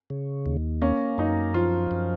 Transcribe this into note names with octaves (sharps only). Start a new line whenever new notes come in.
C#3
D#2
A#3 C#4
F#2 D#4
F3 F4
F#2